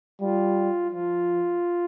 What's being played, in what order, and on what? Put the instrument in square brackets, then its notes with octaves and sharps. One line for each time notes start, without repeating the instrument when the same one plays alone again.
[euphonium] G3 [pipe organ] F4
[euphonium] F3 [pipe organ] F4